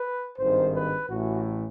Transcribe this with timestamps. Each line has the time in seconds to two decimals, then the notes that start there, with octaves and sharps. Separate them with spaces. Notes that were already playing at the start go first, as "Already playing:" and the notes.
Already playing: B4
0.38 G#1 G2 D#3 C5
0.74 B4
1.09 A1 A2 E3 F#4